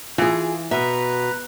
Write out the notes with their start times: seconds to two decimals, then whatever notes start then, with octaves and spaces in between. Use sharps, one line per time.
0.18 E3 F4 G#4
0.71 B2 B4 E5 A#5